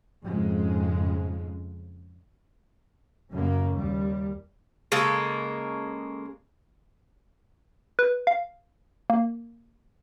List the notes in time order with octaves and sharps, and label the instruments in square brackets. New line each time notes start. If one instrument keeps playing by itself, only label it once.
[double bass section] F2 G#2 C#3 G#3
F#2 C#3 A#3
D#2 G3
[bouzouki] C#3 G#3 A#3 A4
[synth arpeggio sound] B4
F5
A#3